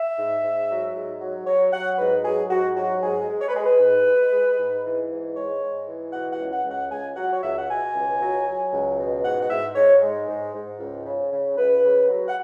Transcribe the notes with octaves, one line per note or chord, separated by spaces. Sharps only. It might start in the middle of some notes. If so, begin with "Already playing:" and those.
Already playing: E5
G#2
G#2
F#3
G#2
F#3
F#3 C#5
F#3 F#5
G#2 B4
F#3 G#4
G#2 F#4
F#3 F#4
G#2 G#4
G#3
C#5
B4
G#3 G#4
B4
G#2
G#3
G#3
G#2
E3
G#2
G#3 C#5
G#2
E3
B2 F#5
F#5
C#2
F#5
C#2
F#5
C#2 G#5
F#3 F#5
C#5
C#2 E5
F#5
B2 G#5
C#2
F#3
F#3
C#2
B2
G#2 F#5
F#5
G#2 E5
G#2 C#5
G#3
G#2
G#2
C#2
C#3
C#3
C#2 B4
C#3
F#3
F#5